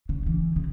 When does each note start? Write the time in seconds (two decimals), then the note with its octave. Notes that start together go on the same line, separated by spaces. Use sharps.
0.09 C#3
0.26 E3
0.56 C#3